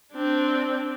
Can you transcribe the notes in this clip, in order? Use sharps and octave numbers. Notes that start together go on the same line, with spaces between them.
C4 D4